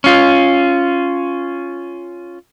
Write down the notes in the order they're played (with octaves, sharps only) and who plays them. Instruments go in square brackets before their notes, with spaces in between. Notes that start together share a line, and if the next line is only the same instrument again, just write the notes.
[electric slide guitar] C#4 F4